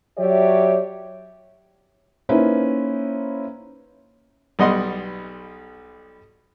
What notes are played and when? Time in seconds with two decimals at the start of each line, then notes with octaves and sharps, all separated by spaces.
0.17 F#3 G4 C#5 D5 E5
2.29 A#3 C#4 D#4 E4 B4 C5
4.59 B1 G3 B3 D#5 F#5 C6